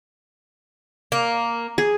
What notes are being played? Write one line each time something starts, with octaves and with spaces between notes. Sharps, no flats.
A#3
G#4